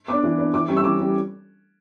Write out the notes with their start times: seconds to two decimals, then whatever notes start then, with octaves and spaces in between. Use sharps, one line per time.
0.08 B3 D6
0.13 D4
0.24 E3
0.38 B3 D4
0.54 E3 D6
0.68 G3 C#4 C#6
0.77 E6
0.84 E3 D6
0.98 G3 C#4